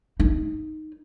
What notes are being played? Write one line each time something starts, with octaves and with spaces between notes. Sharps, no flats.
D#4